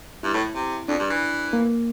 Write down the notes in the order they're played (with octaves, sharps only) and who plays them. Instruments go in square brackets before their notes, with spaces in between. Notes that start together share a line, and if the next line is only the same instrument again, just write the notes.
[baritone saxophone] G2 [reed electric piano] E4
[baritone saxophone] A2
C3
[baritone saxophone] F2 [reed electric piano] D4
[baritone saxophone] G2
E3
[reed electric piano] A#3